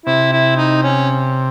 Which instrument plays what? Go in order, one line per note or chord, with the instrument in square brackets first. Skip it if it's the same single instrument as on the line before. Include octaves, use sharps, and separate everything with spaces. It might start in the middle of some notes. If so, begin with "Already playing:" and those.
[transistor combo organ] C3 [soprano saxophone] E4
[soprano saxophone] E4
D#4
C#4